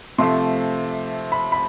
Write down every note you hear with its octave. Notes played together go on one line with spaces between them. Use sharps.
C3 F3 A3 C6
B5
B5